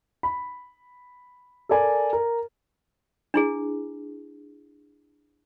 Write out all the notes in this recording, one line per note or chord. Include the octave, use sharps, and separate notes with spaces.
B5
A4 A#4 D5 G#5
A#4
D4 E4 G#4